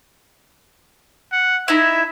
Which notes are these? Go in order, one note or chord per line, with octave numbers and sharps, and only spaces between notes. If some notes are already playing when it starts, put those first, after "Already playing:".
F#5
D#4 E4 E5